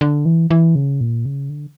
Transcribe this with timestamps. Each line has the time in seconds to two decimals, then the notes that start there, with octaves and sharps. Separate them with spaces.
0.01 D3
0.25 E3
0.50 E3
0.75 C#3
1.01 A#2
1.25 C#3
1.50 D3